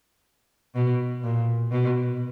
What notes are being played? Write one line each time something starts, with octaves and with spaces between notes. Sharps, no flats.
B2
A#2
B2